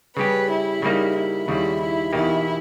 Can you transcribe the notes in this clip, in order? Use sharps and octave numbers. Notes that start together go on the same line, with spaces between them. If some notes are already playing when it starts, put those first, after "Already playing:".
C#3 G3 C#4 G4 B4
E4
C#3 G3 A#3 D#4
E4
D#2 C#3 G3 E4
E4
E2 B2 A#3 D#4 E4 G4